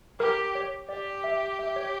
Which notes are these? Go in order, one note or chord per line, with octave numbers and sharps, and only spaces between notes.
G4 A#4
C#5
G4 D5
E5
E5
C#5